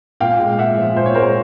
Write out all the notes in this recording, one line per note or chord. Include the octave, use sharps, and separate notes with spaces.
A#2 F5 G5
G#3
A#2 E5 F#5
F3
A#2 C5
C#5
G#3 A#4 C5